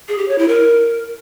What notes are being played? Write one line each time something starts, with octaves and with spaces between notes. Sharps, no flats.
G#4
G4
C#5
E4
A#4